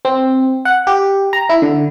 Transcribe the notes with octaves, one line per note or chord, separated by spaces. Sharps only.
C4
F#5
G4
A#5
E4
D3